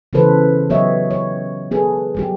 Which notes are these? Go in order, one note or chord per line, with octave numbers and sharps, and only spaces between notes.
C#3 E3 B3 A4 B4 C5
F#3 B3 G4 C#5 D#5 E5
C#5
B3 G#4 A4 B4
F#3 G3 G4